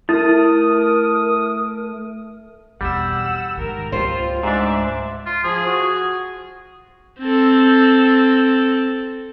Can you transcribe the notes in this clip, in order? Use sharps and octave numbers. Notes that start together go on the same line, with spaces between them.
A3 E4 A#4 D#6
E2 B2 G3 F#5 E6
G#2 D#3 A#4
C#2 A3 F4 G4 C5
G#2 D4 D5 E5
F4
F3 G#4
F#4
C4 A4